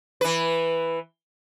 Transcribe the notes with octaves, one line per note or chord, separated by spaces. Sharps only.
E3 B4